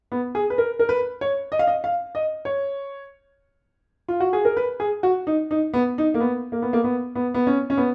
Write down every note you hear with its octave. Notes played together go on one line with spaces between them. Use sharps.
B3
G#4
B4
A#4
A#4
B4
C#5
D#5
F5
D#5
F5
D#5
C#5
F4
F#4
G#4
A#4
B4
G#4
F#4
D#4
D#4
B3
D#4
A#3
B3
A#3
B3
A#3
B3
B3
B3
C#4
C#4
B3